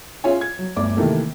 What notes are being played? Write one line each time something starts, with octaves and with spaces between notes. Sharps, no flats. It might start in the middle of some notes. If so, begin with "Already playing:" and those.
C#4 F4 G#4 C#5 E5 G#5
G#6
F#3
G1 D2 D5 D6
C3 D#3 E3 A3 A#3